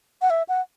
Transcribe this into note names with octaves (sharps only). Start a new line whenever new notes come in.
F#5
E5
F#5